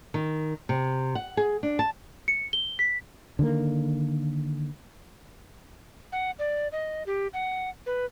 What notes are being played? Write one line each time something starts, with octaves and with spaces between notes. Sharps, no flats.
D#3
C3
F#5
G#4
D4
A5
C#7
G7
B6
D3 D#3 G3 A#3
F#5
D5
D#5
G4
F#5
B4